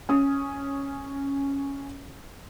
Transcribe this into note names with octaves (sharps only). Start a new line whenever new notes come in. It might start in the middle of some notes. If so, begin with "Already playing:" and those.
C#4 D#6